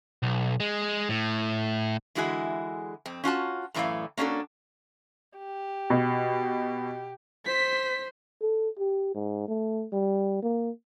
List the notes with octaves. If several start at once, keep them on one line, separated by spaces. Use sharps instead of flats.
B1
G#3
A2
D3 E3 G#3 E4 F#4 G#4
F2 C4
C#4 F4 F#4 A5
F#2 A2 E3 A3 D5 F5
A#3 C#4 D4 F#4 A4
G4
B2
C5 B6
A4
G4
G#2
A3
G3
A#3